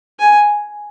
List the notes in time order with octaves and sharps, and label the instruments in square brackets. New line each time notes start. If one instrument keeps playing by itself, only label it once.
[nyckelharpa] G#5